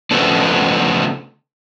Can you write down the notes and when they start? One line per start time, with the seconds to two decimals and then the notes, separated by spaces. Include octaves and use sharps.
0.11 C#3 F3 A3 B3 C4 D4